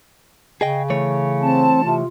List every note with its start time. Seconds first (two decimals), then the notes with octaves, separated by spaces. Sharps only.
0.61 C#3 G#4 D#5 G5
0.90 E3 A3 C#5
1.41 C4 A5
1.84 C3 F4